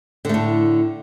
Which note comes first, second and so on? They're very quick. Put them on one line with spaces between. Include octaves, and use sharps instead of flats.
D3 A3 A2